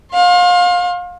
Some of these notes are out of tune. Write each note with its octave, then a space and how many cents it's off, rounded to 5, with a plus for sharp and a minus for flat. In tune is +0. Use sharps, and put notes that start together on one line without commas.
F5 +30 C6 +40